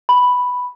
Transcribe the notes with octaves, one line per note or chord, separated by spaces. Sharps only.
B5